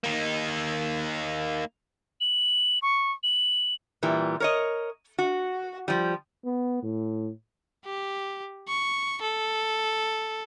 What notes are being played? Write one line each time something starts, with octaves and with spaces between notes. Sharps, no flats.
A#3 D#4
F#7
C#6
F#7
A#2 E3 G3
A#4 C#5 D#5
F#4
F3 G3
B3
A2
G4
C#6
A4